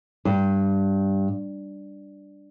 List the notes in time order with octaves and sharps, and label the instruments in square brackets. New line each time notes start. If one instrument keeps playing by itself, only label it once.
[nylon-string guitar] G2